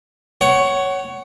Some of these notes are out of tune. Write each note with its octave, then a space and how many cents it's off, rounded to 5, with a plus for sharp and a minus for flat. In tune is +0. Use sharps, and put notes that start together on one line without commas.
C#5 +0 F#5 +25